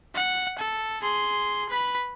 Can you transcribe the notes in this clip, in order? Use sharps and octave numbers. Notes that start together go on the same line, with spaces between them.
F#5
A4
G#4 C6
B4 B5